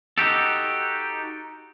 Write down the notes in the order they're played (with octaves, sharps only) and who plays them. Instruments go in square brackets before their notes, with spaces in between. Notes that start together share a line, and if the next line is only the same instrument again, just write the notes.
[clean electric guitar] D#4 F#4 G4 A4